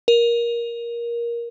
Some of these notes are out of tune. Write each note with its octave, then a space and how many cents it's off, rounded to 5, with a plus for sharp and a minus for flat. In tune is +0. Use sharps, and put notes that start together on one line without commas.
A#4 +15